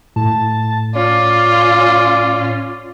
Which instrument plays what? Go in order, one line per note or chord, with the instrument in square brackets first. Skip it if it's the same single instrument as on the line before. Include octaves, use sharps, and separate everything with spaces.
[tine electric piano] A2 [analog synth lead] A5
[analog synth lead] C#4 [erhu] F4 [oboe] D5